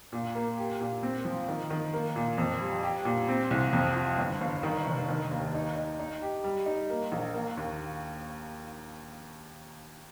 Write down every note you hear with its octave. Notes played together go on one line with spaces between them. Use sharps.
A#2
A#3
G4
A#2
C4
F3
D#3
D#3
A#3
A#2
F2
G3
G4
A#2
C4
C2
F2
F4
G1
G1
D#3
F1
D#3
D#2
D#4
D#4
D#4
G4
G3
D#4
A#3
A#1
A#3
D#2